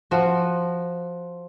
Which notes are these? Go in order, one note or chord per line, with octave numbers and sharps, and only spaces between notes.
F3 F#4